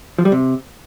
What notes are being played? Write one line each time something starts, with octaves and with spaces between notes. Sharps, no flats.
F3
G3
C3